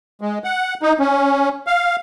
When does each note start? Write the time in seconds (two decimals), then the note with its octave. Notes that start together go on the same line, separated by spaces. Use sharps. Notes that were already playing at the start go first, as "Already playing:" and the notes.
0.21 G#3
0.44 F#5
0.82 D#4
1.00 C#4
1.67 F5